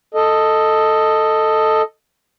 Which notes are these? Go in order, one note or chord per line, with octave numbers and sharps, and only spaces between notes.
A4 D#5